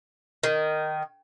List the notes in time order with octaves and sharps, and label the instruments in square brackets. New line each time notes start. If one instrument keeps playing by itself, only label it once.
[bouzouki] D#3